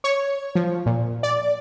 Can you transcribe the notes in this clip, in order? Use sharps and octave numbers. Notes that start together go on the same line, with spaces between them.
C#5
F3
A#2
D5